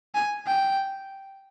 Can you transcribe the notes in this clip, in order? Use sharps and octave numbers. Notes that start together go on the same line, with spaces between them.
G#5
G5